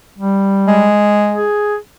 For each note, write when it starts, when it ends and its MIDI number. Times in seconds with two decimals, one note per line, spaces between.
0.18 0.89 55
0.68 1.46 56
1.34 1.76 68